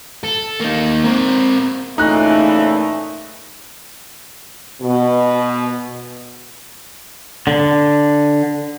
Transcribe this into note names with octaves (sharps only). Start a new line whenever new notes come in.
A4
A#3 D#4
C4 A#4
A#2 C#3 E3 A3 D#4 F#6
B2
D3